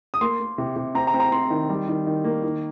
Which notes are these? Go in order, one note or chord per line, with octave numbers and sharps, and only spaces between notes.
D#6
A#3 C6
A#3
C3
C3
C4 A#5
A#5
C4
A#5
C4 C6
D#3
G3
D#3
D#3
A#3
D#3